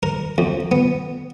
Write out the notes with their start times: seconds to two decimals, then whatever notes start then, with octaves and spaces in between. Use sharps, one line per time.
0.03 A#4
0.38 F2
0.72 B3